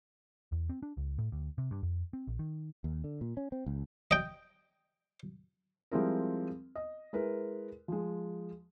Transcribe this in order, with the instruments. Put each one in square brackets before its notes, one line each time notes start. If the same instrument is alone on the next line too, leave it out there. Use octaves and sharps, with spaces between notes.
[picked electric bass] E2
C4
D4
C#2
A2
D2
C3
G2
F2
C4
A#1
D#3
[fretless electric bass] D#2
D3
A#2
C#4
C4
C#2
[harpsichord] D#5 G5
[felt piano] F3 G3 G#3 C4 E4 A#4
D#5
G#3 E4 A#4 B4
F3 G#3